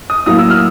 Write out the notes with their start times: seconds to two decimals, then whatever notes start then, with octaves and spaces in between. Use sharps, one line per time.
0.10 D#6
0.26 A2 F#3 A#3 D#6
0.38 E6
0.50 F6